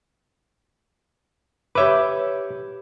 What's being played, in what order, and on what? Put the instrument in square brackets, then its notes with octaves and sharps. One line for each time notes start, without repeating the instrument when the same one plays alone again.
[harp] G4 C#5 D6 [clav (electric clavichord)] B4 E5